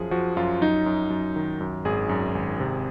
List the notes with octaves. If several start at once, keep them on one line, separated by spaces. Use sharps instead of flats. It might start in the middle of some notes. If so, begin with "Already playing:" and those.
Already playing: F#2 F3 G#4
F3 F#4
F#2 F4
F#3 D#4
F#2
F#2
D#3
F#2
G#1 G#4
F#2
G#1
C3